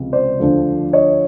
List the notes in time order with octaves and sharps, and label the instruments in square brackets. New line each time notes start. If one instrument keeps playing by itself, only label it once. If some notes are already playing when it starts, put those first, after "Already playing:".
Already playing: [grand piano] C#2 C3 F3
C5 D5
D2 D3 F3
C#5 D#5